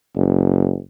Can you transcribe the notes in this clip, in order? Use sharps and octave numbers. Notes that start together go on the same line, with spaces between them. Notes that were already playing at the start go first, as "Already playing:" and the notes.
F#1